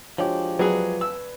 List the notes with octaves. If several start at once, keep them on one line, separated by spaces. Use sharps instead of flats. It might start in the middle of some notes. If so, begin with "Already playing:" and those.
F3 G#3 D4 F#4 G4 C#5
F#3 G#4 B4 D5 G#6
E6